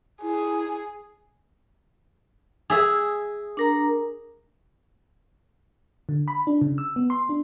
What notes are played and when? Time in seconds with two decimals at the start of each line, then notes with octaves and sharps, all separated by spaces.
0.22 E4 G#4
2.70 G#4 E5
3.57 D4 A#4 A#5
6.09 D3
6.28 B5
6.47 D4
6.61 C#3
6.78 E6
6.96 B3
7.10 C6
7.29 D4